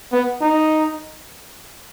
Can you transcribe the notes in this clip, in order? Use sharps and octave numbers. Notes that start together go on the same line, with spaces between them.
B3
D#4